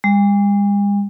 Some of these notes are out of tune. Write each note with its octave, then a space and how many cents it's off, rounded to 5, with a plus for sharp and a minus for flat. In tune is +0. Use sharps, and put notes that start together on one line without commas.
G#3 -45